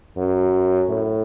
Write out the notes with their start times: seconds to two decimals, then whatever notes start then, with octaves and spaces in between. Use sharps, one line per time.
0.17 F#2
0.89 A2